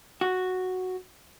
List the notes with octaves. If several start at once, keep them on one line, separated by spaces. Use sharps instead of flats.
F#4